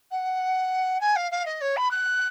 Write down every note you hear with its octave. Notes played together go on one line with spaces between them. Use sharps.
F#5
G#5
F5
F5
D#5
C#5
B5
F#6